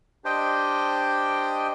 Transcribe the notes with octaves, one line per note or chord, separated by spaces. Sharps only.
D4 G4 C5 D#5 G5